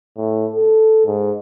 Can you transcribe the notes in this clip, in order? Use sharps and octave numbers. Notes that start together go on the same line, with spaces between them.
A2
A4
G#2